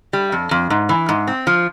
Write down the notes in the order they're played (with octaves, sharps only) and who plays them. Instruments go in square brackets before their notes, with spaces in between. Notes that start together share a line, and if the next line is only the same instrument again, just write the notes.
[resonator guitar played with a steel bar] G3
F2
F2
G#2
E3
G#2
C4
F3